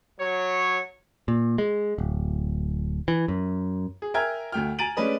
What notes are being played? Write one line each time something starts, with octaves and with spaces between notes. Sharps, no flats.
F#3 C#5
A#2
G#3
D1
E3
F#2
G#4
A#4 E5 G5 G#5 F6 G#6
D2 A3 G5 F6
G#5 A#5 A6 D7 D#7 F#7
G#3 A3 C#4 D4 B4 D#5